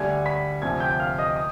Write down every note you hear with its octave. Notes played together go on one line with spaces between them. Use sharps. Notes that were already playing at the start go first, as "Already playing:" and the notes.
Already playing: D2 D3 G3 G#5 G#6
B5 B6
D2 C3 F3 G#5 G#6
G5 G6
F5 F6
D#5 D#6
D#6